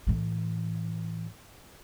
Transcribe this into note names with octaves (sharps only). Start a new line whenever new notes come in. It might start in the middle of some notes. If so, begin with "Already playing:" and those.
A2 E3